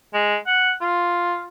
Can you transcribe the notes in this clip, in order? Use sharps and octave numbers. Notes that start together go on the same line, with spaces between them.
G#3
F#5
F4